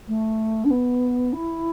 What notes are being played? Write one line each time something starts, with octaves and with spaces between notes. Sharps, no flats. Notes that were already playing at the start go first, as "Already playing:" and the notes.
A3
D4
B3
E4